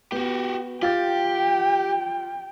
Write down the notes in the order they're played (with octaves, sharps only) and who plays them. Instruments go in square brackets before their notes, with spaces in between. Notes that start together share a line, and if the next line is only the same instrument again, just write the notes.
[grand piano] B3 [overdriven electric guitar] F#4 G4
[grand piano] F4 A6 [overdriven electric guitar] G4 [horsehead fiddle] G5